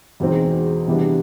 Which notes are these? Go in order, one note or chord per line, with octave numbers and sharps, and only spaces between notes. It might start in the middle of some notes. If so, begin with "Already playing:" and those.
E2 B2 G#3 C4 D#4
C3 E3 G3 B3 D4